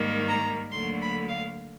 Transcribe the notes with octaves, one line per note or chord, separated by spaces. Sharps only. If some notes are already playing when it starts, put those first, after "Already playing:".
Already playing: G#2 D#3 G3 A#3
A#5
D2 D3 F#3 A#3 C6
B5
F5